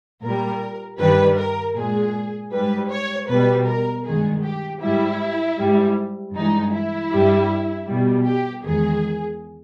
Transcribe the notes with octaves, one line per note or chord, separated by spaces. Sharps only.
A#2 G3 A#4
G2 D#3 G3 B4
A#4
A#2 G#3 G#4
G#2 G3 B4
C#5
B2 G3 B4
A#4
G2 D#3 G#3 G#4
G4
G#2 G3 E4
G#2 G3
G2 E3 G#3 D#4
E4
G2 G3
B2 G3
G4
E2 D#3 G#3 G#4